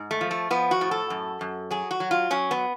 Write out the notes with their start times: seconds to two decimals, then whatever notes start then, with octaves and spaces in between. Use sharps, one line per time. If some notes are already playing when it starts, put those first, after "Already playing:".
Already playing: G#2
0.11 A3
0.21 F3
0.31 A3
0.50 F3 B3
0.71 F#4
0.81 A2
0.91 A4
1.10 F#2
1.41 F#2
1.71 F#3 G#4
1.91 F#4
2.00 F#3
2.11 F4
2.30 F#3 C#4
2.51 B3